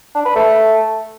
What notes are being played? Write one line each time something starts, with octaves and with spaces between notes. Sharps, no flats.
D4
B4
A3